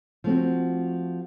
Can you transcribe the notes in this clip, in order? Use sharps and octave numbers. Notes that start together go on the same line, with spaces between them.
F3 A3 C4 F#4